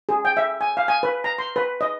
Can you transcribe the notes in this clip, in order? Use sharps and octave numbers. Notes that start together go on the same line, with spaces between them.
G#4
G5
E5
G#5
F5
G#5
B4
A#5
C6
B4
D#5